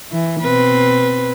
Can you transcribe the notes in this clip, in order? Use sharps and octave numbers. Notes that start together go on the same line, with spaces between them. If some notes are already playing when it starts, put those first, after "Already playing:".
E3
B2 C4 B4